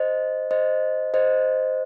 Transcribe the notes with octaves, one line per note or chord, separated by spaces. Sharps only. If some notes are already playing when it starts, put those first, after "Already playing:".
Already playing: C5 D#5
C5 D#5
C5 D#5